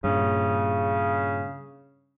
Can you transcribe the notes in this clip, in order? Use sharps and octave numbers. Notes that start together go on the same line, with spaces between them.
G2 A#2 C#3